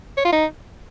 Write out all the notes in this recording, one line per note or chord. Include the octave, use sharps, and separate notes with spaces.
C#5
F4
D#4